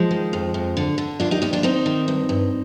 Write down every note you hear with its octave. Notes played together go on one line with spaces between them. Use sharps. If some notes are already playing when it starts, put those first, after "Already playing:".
Already playing: F3 G#3
D#3
F2
F2
D3
D3
D#2 D4 F4
D#4 G4
D#2 D#4 G4
D4 F4
D#3 C4 D#4
D#3
G2
G2